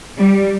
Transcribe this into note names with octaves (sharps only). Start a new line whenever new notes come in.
G3